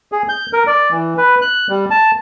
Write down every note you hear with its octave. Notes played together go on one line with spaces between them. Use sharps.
G#4
G6
A#4
D5
E3
B4
F#6
G3
A5